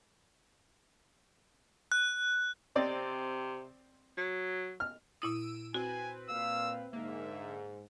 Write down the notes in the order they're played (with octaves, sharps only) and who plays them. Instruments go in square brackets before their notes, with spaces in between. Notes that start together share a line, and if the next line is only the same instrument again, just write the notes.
[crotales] F#6
[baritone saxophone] C3 [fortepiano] C4 D5 D#5
[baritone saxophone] F#3
[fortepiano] F6
[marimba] A#2 E4 D#6 [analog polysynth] E6 D7 D#7
[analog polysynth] C4 B4 [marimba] F#4 [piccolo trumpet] G#5
[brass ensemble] A#2 F5 [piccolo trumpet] E6
[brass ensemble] G#2 [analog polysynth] D3 A#3 [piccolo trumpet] E5